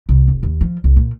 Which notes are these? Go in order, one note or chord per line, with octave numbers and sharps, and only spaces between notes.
C2
F1
D#2
F3
C2
A#2